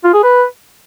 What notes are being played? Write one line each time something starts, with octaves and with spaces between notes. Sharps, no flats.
F4
G#4
B4